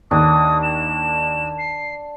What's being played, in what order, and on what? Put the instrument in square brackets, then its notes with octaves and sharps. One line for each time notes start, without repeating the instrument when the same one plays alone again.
[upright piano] D#2 [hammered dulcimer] D4 D6 [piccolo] D#6
[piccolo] E7
C7